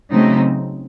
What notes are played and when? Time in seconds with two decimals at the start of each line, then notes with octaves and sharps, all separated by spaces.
0.12 C#3 F#3 A3 C4 D#4